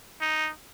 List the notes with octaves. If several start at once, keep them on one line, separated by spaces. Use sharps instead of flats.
D#4